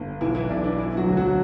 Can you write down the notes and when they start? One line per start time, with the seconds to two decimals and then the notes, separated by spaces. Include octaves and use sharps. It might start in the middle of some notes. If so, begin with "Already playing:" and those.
Already playing: G1
0.21 B1 E3 E4
0.35 E3 E4
0.49 B1 D4
0.64 D4
0.78 E3 E4
0.97 F#3 F#4
1.08 D2
1.17 F#3 F#4